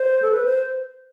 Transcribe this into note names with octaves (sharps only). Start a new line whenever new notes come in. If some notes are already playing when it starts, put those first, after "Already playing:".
Already playing: C5
A4
B4
C5